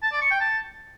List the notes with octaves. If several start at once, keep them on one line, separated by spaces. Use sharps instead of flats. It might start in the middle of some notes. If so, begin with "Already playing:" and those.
A5
D5
C#6
G5
A5